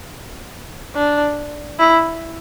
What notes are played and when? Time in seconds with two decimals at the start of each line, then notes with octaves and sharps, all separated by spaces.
0.95 D4
1.79 E4